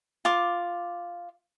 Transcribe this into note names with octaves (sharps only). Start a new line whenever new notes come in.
F4 D6